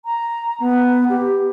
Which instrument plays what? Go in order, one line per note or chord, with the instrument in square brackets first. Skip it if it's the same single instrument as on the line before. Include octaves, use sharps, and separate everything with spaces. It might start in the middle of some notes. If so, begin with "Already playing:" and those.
[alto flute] A#5
B3
G4